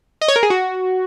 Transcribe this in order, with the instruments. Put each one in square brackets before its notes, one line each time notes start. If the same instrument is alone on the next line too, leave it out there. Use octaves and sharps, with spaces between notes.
[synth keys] D#5
C#5
A#4
G#4
F#4